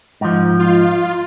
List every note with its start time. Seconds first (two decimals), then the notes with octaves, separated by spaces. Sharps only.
0.21 G#2 F3
0.59 F4